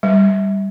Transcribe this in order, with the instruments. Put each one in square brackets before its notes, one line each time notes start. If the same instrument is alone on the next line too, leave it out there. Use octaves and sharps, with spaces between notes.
[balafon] G3